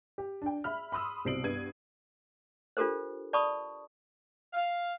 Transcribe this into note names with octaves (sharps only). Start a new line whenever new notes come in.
G4
D4 G5
E5 B5 F6
B5 C6 D#6 E6
C2 B2 C4 C7 D7 F#7
G2 B3 G#6 D#7
D4 F4 G4 A4 A#4 C5
D5 A5 B5 C#6 D#6
F5